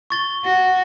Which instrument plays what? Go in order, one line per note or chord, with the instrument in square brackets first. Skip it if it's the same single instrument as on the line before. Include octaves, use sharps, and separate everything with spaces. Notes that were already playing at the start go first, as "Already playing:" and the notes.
[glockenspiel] C#6 A6 G7
[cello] F#4